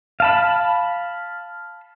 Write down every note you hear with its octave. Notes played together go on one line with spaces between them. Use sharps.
F5 A5 B5